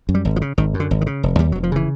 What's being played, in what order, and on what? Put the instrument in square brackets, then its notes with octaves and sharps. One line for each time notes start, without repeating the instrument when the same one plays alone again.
[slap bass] F#2
G3
G#1
F3
C#3
G#1 D#3
F#2
D3
G#1
D#3
C#3
F1
D#2 G3
F1 F#3
F3
C#3 E3